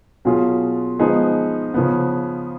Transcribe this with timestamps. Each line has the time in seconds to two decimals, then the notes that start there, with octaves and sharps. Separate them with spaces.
0.25 B2 F#3 C#4 F4 G#4
0.99 F3 G#3 B3 D#4 G#4
1.74 C#3 F3 B3